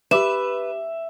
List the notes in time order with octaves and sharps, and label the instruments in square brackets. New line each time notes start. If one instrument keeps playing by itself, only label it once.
[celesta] G4 D6 E7 [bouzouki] B4 [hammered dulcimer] E5